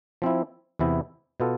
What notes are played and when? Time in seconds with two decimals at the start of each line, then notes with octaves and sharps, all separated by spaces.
0.22 F3 C4 E4
0.79 E2 C3 E3 B3 E4
1.40 B2 B3 F4 A4